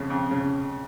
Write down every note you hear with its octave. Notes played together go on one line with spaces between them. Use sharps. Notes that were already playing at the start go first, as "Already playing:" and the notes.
Already playing: F2 C#3
F2
C#3